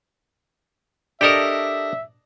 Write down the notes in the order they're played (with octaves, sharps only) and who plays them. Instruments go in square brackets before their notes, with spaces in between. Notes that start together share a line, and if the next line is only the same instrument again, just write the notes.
[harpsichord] D4 D#5 [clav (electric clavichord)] G4 A4 A#4 [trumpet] E5